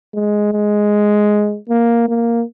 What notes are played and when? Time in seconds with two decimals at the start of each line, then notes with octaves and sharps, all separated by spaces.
0.14 G#3
0.53 G#3
1.69 A#3
2.08 A#3